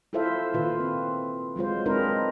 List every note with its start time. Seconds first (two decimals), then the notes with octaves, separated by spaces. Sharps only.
0.13 E4 F4 A4 C5 E5 F5
0.54 A#2 D#3 F4 B4
0.80 C4
1.56 F#3 G#3 F4 C5
1.86 G#3 C4 D4 D#4 A#4 B4